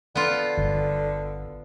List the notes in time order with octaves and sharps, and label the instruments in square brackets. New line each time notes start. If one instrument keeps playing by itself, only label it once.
[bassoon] D3 [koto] B3 F4
[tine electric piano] G1